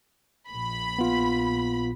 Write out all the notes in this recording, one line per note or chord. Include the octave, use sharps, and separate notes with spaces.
A#1 B5
B3 F4